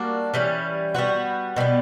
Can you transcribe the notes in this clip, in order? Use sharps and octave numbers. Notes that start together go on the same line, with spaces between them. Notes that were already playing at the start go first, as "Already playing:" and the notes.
Already playing: G3 A#3 D4 F#4
E3 G3 C#4
G3 B3 F#4
B2 G3 B3